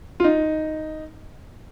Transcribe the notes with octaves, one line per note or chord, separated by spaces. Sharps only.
F4
D#4